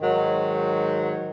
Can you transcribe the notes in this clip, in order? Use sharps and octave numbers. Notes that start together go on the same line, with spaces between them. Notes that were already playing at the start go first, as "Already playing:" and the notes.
G#2 D#3 F#3